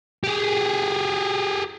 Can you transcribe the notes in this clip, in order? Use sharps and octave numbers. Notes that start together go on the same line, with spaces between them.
G4 G#4